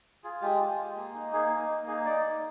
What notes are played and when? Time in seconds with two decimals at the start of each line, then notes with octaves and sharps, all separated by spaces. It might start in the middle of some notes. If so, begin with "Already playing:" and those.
0.24 F4 G#4
0.42 G#3 G4
0.60 F4
0.78 G#3
0.96 A#3
1.14 D#4
1.33 A#3 G#4
1.51 D#4
1.69 A#3
1.87 D#4 G#4
2.05 D#4 D5
2.24 A#3